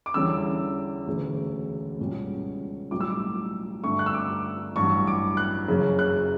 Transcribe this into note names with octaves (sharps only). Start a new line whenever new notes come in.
D6
E2 D3 G3 C#4 E6
E1 D2 C#3
C#2 B2 G3 C#4
B1 A2 G3 D6
E6
D6
G2 D3 A3 D4 C#6
F#6
E6
D6
A1 G2 F#3 C#6
D6
F#6
F#1 F#2 C#3
F#6